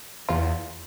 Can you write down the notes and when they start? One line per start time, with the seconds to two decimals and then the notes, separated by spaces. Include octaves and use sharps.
0.29 E2 F4